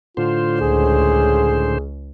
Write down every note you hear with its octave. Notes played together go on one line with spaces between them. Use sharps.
A2 D3 F4 C5
C#2 G#4